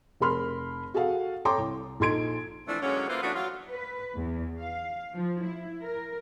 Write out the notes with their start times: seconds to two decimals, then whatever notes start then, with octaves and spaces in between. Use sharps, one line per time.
0.20 F1 G#4 A#4 B5 C6 F6
0.94 F#4 G#4 A4 F5 F#5
1.45 A4 C#5 G5 A#5 C6 D6
1.58 C2
2.00 A#1 D#4 A4 C6 G#6 D7
2.67 E3 F3 A3 C4 D4 E4
2.82 D3 F#3 G#3 A#3 C#4
3.09 D3 A#3 E4 F4 B4 C5
3.23 E3 A3 B3 C#4 D4 F#4
3.35 F#3 F4
3.70 B4
4.16 E2
4.59 F5
5.14 F3
5.45 E4
5.82 A#4